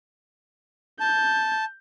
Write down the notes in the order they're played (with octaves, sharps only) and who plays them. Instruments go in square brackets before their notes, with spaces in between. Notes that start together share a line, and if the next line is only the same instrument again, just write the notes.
[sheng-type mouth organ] A5 [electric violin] G6